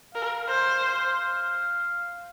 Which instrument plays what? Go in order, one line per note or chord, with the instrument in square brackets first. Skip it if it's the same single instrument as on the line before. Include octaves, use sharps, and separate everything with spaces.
[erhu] A#4 [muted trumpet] F5
[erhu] C5